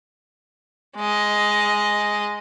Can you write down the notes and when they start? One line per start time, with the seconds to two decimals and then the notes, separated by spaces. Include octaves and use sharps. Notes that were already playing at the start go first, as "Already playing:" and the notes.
0.97 G#3 D#5